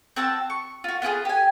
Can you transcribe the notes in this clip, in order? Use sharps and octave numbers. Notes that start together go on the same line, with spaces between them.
C4 F#4 A5 E6
C#6
F4 F#4
B3 F4 G4 G#4
G4 G#5